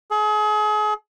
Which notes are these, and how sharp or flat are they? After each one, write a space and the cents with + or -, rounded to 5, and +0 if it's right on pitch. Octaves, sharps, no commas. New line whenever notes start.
G#4 +35